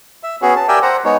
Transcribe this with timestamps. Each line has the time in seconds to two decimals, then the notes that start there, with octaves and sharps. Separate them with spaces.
0.23 E5
0.42 B3 C#4 F#4 G#4
0.56 A5
0.68 G4 A#4 D5 E5 G5 G#5
0.82 C5 F#5 A#5
1.04 G#3 B3 D#4 C#5